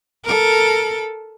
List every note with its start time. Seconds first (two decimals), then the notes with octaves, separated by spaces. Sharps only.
0.24 A4 A#4